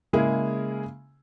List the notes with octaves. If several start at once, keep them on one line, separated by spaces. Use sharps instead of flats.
C#3 G#3 A#3 E4 G#4